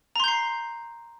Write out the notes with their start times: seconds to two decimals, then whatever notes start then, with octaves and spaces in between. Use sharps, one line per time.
0.16 A#5
0.20 C6
0.24 G6
0.28 C7